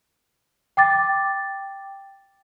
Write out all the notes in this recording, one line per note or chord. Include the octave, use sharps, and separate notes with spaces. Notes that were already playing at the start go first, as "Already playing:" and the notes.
G5 D6 A6